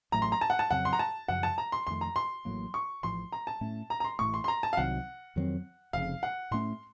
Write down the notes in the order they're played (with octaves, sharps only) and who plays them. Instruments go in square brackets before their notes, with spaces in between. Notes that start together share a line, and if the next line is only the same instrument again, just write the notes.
[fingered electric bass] A1 A2 F#3 A3 [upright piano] A#5
[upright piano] C6
A#5
A5
F#5
A5
[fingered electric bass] F2 C#3 F#3 C4 [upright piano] F#5
[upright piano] C6
A#5
A5
[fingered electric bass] F#2 C#3 F3 [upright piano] F#5
[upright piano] A5
A#5
C6
[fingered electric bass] F2 D#3 A3 [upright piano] C6
[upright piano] A#5
C6
[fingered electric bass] A1 A2 F#3 A#3
[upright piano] C#6
[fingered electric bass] A1 A2 F3 [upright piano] C6
[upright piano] A#5
A5
[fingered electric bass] A2 A3 C#4
[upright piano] A#5
A#5
C6
[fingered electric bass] A1 A2 A3 [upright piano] C#6
[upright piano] C6
C6
A#5
A5
F5
[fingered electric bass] C2 C3 D#3 F#3 [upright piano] F#5
[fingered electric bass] F2 D#3 F#3 C4
[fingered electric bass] F1 F2 C#3 [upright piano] F5
[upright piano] F#5
[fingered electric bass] A2 A3 C#4 [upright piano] C6